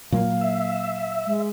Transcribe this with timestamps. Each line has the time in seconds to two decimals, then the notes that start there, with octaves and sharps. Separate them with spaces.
0.12 A#2 F#3 A#3 F5
0.41 E5
1.26 G#3